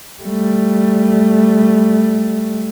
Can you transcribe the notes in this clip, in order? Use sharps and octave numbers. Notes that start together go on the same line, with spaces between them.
G3 A3